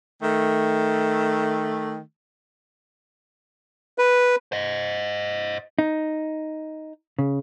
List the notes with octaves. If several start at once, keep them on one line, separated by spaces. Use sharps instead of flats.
D#3 A3
B4
C5 D#5
D#4
C#3